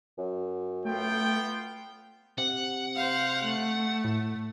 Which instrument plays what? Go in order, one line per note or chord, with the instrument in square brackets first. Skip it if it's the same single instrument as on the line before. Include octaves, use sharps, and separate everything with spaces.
[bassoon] F#2
[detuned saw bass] A3 [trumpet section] B3 F4 G5
[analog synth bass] C3 [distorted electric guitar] F#5
[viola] C5 F5
A3
[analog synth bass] A2